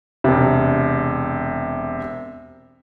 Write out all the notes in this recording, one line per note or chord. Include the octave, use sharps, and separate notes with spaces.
E1 C3